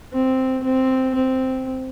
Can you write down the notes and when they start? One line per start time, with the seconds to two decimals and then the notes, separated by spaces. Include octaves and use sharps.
0.13 C4
0.63 C4
1.15 C4